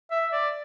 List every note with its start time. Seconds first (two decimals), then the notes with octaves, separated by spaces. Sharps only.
0.11 E5
0.33 D5